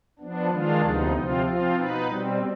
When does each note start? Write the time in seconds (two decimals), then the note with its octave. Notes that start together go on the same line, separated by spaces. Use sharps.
0.19 F3 B3 D4
0.50 D#3 G#3 D4 F4
0.82 D2 C3 F3 B3 D#4
1.14 C3 F3 C4 F4
1.44 F3 C4 F4
1.76 B2 B3 D#4 B4
2.07 B2 G3 C4